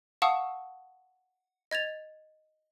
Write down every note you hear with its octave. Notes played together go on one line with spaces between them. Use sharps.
F5 F#5 A5 C#6 D#6 E6
D#5 G#6 A6 F7